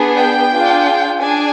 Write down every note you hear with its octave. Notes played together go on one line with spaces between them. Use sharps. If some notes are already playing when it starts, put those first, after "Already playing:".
Already playing: B3 D4 G#4
G5
D4 F4 G#4
D4 G#4 G#5